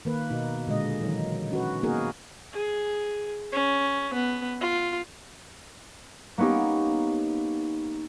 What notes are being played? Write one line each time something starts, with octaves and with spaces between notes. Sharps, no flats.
D#3 A#3 B4
B2 D#4
A#2 D3 G#3 D#5
D#3 E3 F#3 D#4
C#4 F#4 B4
A#3 B3 D#4 F#4 G#4 A#4
G#4
C#4
B3
F4
A#3 B3 C#4 D#4 G4